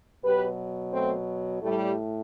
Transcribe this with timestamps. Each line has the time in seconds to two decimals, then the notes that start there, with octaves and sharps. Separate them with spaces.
0.24 B2 F#3 G4 B4
0.93 A3 C4
1.62 A2 G3 A3